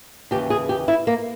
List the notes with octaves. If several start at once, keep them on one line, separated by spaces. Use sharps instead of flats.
D#2 C#3 E3 G4
G#4
G4
E4
A#3